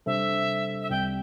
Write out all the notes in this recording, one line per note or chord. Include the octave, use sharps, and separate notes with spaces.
C3 G3 D4 A4 C5 E5
E5
C2 C3 G3 C4 G5